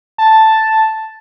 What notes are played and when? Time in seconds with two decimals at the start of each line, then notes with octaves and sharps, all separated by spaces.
0.18 A5